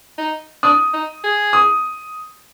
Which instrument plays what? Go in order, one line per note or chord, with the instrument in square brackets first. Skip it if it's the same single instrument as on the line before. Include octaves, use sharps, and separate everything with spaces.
[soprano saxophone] D#4
[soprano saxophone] D4 [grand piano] D#6
[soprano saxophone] D#4
G#4
[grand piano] D#6